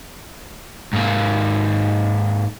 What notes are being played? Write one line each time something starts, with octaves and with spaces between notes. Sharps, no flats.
G#2 A#3